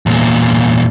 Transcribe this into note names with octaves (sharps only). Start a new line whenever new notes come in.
E2 A#2